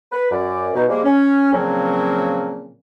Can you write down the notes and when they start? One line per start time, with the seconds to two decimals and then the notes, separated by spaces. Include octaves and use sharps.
0.12 B4
0.31 F#2 D5
0.73 B2 D#4
0.89 F3 G3 G#3 A#3
1.04 C#4
1.53 A#2 C#3 F3 F#3 A#3 C4